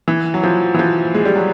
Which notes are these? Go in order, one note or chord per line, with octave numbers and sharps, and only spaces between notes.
E3
F#3
F3
E3
F3
G#3
G3
F#3